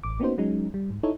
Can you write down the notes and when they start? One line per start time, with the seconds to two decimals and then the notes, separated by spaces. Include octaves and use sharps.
0.03 A1 D6
0.20 A#3 B3 C#4 D#4 F#4 C5
0.38 F#3 G#3 C#4 D#4
0.74 G3
0.90 G#2
1.03 D#4 E4 A4 C#5